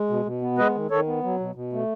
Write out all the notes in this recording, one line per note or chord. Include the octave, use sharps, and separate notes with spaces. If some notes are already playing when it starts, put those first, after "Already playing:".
Already playing: G#3
B2
B2
B3
G#3 B4 D#5
D#3
D#3 A4 C#5
B3
F#3
B2
B2
A3